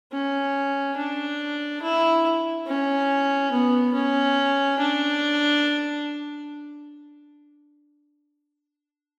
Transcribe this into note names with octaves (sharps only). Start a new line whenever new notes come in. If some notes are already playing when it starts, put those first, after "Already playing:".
C#4
D4
E4
C#4
B3
C#4
D4